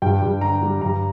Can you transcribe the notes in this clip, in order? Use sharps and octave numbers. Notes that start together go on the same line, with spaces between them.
G2 G5
G2
D3 A#5
G3
G2 A#5